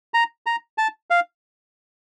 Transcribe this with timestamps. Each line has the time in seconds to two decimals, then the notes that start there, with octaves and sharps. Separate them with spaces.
0.14 A#5
0.46 A#5
0.78 A5
1.10 F5